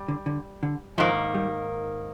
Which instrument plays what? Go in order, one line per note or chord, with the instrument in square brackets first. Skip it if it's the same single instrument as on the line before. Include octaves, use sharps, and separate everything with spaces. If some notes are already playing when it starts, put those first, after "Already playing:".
Already playing: [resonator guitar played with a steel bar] G3
[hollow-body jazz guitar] D3
D3
D3
[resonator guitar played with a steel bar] G#2 D#3 A#3 [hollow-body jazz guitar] F3
[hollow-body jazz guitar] G3